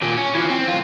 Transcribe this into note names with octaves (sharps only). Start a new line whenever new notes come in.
D#2 A#2
C#4
E3 F3
C4
B1 F4